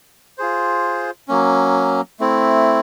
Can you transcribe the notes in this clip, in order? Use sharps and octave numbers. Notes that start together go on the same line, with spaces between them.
F4 G#4 C5
F#3 A#3 C#4
A3 C4 E4